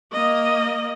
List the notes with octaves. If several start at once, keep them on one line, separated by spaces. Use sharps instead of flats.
A#3 D#5